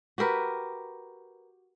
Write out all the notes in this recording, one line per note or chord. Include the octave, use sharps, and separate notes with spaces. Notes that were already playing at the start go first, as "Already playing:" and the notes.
F#4 G4 A#4 B4